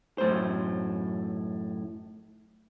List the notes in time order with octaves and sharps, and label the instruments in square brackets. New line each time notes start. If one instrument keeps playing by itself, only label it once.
[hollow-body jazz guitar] F#2 A2 C5